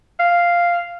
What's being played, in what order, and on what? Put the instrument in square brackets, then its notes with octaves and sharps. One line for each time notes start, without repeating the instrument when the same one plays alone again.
[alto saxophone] F5